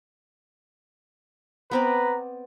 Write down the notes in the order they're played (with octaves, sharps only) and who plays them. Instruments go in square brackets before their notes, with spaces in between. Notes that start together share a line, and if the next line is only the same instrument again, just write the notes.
[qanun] B3 C4 D5 [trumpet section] B4 A#5